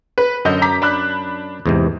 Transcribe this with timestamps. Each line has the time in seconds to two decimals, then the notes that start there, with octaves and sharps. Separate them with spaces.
0.18 B4
0.45 F#2 D3 D#5 G6
0.62 A#5 D6 B6
0.82 D4 B5 F#6
1.66 E2 G#2 C3